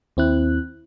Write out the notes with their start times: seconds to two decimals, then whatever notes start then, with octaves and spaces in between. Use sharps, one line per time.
0.17 D#2 C4 E4 F#6